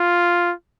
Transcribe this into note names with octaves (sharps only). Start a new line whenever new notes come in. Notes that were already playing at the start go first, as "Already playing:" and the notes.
Already playing: F4